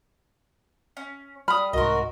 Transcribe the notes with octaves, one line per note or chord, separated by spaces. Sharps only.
C#4
G3 B5 D#6 F6
C2 G#2 F#4 A#4 D#5 C6